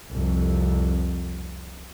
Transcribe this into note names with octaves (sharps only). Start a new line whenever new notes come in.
C2 F2